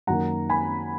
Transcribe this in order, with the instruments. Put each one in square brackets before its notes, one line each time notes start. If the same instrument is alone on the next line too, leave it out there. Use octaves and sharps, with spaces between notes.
[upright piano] F#2 D#3 A#3 F#5 A#5
G#5 B5